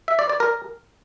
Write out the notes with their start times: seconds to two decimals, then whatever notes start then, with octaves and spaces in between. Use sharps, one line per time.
0.08 E5
0.19 D5
0.29 D5
0.40 A#4